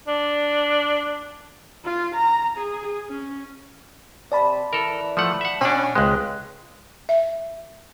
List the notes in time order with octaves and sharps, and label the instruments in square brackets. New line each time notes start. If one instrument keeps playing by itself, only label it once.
[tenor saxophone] D4
[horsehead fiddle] F4
A#5
G#4
C#4
[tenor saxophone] C3 [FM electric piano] D5 A5 B5
[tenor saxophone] E3 [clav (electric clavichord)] A4 A#4
[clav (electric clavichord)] F3 A3 F#5
E5 F#5
[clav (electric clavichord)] B2 D4 [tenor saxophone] C#4
[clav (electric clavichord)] C#2 G#3 [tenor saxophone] C4 [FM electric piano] F#6
[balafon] E5